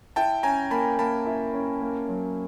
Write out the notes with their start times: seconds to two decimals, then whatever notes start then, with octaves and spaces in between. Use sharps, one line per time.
0.16 E4 G5 A5
0.43 C#4 G#5 A#5
0.71 A#3 A5 B5
0.98 A#3 A5 B5
1.26 E4
1.54 C#4
1.81 A#3
2.08 F#3